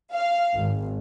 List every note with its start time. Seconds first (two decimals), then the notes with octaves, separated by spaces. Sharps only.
0.13 F5
0.54 G#1